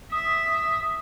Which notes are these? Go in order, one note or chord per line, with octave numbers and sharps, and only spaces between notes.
E5 D#6